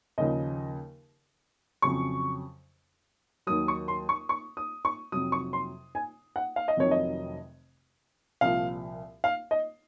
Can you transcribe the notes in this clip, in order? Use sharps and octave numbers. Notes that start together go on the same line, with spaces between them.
D#2 C#3 F3 D#5
F2 C#3 F#3 C#6
D#2 D#3 F#3 D#6
C#6
C6
C#6
C#6
D#6
C#6
F2 C3 F#3 D#6
C#6
C6
G#5
F#5
F5
D#5
F1 F2 C3 D#3 F#3 C#5
D#5
C2 A#2 F3 F5
F5
D#5